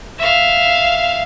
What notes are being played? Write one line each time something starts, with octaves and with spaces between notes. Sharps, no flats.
E5 F5